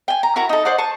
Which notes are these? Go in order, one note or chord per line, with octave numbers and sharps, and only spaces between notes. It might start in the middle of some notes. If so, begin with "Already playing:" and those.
G5 G#5
A#5
E4 F#4 A#4 A#5
D#4 A4
C5 D5 D#5 F#5
A5 C#6 D#6